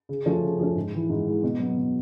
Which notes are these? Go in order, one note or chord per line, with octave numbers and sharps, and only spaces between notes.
C#3
F3 A3 C#4
C#3
F3 A3 C#4
G#2
E3 G#3
G#2
E3 G#3
B2
F#3 B3
B2